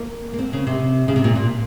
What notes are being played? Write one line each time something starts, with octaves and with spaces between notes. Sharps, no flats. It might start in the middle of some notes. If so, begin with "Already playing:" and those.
Already playing: A#3
A#3
C4
C#3
C3
C#3
C3
A#2
A#2